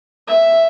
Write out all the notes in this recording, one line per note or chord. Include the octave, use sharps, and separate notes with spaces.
E5